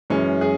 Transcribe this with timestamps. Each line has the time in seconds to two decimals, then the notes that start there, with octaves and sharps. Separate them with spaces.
0.10 F#2 E3 G#3 C#4
0.41 G#4